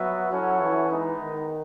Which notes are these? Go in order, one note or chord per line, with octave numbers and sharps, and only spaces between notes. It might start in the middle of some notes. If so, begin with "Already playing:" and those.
Already playing: F#3 B3 F#4 B4 E5
F#3 C#4 E4 A4 C#5 F#5
E3
G#3 B3 D#4
D#3